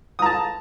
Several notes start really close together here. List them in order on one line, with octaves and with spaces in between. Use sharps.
D#6 A#5 A5